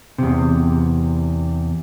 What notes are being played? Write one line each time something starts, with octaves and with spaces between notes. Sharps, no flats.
E2 C3